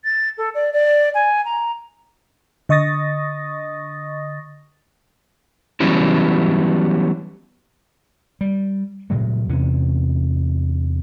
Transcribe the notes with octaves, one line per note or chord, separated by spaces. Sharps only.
A6
A4
D5
D5
G#5
A#5
D3 D#5 C#6 D#6 A6 A#6
E3 F#3 G3 B3 C#4 E4
G3
A#2 C#3 F#3 A3
E2 C3 C#4